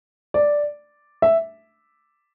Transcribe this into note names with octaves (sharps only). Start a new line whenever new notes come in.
D5
E5